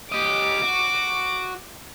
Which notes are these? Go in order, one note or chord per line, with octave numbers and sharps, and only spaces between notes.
G4 D#5 D6
F#4